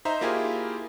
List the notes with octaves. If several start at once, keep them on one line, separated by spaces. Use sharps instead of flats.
D#4 C5 E5 A#5
A#3 E4 F4 G4 G#4